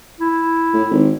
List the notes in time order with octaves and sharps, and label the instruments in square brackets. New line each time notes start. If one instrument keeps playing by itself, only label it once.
[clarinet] E4
[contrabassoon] A2
G#1